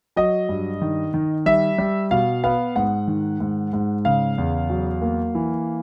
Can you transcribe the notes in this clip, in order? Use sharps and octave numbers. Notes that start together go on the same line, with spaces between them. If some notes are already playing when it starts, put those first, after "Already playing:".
F#3 D#5
G2
D#3
D#3
G3 E5
G3
B2 F5
B3 F5
G#2 F#5
D#3
G#2
G#2
C#3 F5
E2
F#3
A#3
E3